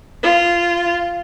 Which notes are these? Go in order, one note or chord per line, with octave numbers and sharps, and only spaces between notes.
F4